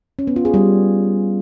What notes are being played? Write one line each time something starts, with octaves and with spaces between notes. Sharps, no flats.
C#4
B3
F4
G#4
G3